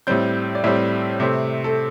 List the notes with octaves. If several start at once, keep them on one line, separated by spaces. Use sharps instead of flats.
A2 G3 C4 G6
D5
A2 G3 C4 E5
C3 A3 C4
A4